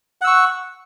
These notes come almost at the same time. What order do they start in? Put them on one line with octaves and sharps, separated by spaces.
F#5 E6 C#6